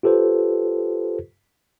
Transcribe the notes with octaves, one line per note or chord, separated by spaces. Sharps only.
F4 G4 A4 B4 C5